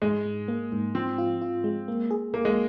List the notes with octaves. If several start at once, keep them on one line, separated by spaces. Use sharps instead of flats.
G#2 G#3
G#2
A#3
G#2
F3 C4
F4
F4
G#3
A#3
G#4
A#1 A#3
G#3